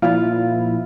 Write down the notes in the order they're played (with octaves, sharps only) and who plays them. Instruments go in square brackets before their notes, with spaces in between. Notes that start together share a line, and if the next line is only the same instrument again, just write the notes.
[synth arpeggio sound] A#2 F3 E4 [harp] F4